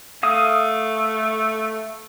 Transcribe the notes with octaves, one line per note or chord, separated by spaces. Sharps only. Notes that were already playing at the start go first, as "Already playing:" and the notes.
A3 F5 D#6